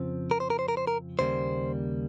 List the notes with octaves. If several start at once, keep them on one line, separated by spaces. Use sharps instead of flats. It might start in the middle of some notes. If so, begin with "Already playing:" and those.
Already playing: F2 C#3 F3 C4
A#4
C5
A#4
C5
A#4
C5
A#4
D#2 C#3 G3 A#3 C5